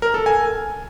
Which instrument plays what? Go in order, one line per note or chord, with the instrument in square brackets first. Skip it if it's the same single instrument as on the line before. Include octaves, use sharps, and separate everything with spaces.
[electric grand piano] A#4
A4
G#5